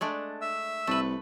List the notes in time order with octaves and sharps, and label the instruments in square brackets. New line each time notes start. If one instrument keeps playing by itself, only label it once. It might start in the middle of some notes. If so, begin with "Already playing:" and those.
[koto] G#3 A3 D4
[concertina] E5 E6
[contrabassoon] C2 [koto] A3 B4